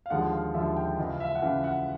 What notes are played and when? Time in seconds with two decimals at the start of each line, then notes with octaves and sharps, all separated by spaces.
0.06 F5
0.10 D#2 D3 F3 G#3 F#5
0.32 F5
0.54 D#2 D3 F3 G#3 E5
0.76 G5
0.98 C#2 C#3 E3 D#5
1.09 F5
1.20 E5
1.35 F#5
1.42 C#2 C#3 E3 F5
1.64 F#5